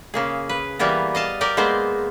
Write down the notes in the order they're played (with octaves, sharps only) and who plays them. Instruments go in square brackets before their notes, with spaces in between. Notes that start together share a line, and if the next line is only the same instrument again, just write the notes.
[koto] C#3 A#3 G#4
B4
E3 G3 A#3 B3 A#4
D#5 F5 A5
G4 A#4 D5
G#3 A#3 B3 C5